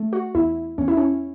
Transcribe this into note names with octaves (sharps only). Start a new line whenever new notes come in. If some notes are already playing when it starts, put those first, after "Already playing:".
Already playing: A3
F#4
E2 E4
E2 C#4
E4
C#4